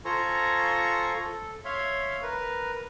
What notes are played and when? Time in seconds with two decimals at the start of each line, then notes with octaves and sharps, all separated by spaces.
0.05 F4 A4 C5 G#5 A#5 C#6
1.20 A4
1.65 C#5 E5 F5 C6
2.22 A#4 B4